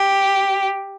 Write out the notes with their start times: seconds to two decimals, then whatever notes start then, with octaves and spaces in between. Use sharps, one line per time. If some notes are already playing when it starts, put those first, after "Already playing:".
Already playing: G4